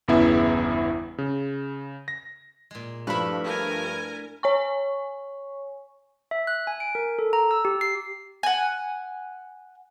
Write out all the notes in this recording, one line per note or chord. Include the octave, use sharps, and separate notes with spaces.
G1 E2 C#3 B3 E4 E5
C#3
A#6
A#2 G#3
G2 F3 A3 D4 E4 B4 B5
A#4 G#5
C#5 G#5 C#6
E5
F#6
G#5
D7
A#4
A4
A#5
E6
G4
C7
F#5 G#5